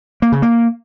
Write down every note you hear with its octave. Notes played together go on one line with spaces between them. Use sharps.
A#3
C#3
A#3